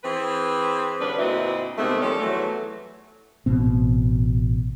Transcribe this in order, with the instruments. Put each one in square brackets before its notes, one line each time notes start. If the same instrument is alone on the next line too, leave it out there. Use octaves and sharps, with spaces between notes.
[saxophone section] E3 C4 G#4 B4 C5
G2 D3 C#4 D4 B4
D2 A#2 C4 E4 F#4 D#5
C3 D#3 G#3 A3 B3 C4
D#3 F3 G3 C#4 A4 D5
E2 E3 F#3 A3
[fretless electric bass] A1 B2 C4